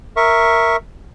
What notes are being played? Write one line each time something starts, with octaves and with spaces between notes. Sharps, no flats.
A#4 E5 C#6